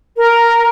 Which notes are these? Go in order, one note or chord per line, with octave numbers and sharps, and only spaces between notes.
A#4